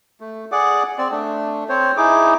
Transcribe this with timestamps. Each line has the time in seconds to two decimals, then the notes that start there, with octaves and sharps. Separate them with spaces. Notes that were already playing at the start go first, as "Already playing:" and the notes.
0.20 A3
0.52 G#4 D5 F#5 D6
0.98 C4 D5
1.11 A3 D4
1.69 C4 C5 C#5
1.97 D#4 E4 G#4 D6